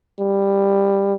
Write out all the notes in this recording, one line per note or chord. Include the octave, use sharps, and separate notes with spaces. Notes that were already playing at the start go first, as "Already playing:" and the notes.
G3